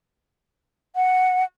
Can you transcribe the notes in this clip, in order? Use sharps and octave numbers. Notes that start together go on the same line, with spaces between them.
F#5